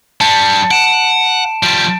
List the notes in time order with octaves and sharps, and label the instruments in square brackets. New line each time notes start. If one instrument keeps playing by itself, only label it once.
[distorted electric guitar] G3 D4 [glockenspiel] A5 C#7
[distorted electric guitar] F#5 [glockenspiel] D7 E7
[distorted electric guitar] F3 G3 [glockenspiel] D7